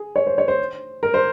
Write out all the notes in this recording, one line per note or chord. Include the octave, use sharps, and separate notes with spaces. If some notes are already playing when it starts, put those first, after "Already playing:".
Already playing: G#4
C#5
C5
C#5
C5
A#4
C5